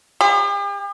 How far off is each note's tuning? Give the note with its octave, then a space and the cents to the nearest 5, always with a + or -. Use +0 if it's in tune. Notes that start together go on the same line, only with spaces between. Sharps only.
G4 +45